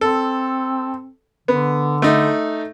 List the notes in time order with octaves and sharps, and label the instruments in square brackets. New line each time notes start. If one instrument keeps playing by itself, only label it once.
[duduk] C4 [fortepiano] A4
[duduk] D3 [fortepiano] B3
[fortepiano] A3 D#4